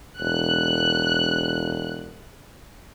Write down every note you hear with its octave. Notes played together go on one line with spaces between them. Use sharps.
E1 F#6